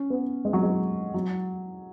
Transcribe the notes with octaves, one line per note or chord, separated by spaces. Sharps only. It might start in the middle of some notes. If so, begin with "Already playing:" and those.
Already playing: C#4
B3
G#3
F#3
G#3
F#3